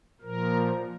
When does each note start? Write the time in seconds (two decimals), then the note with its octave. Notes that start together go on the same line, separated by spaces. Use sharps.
0.21 A#2 F3 A#4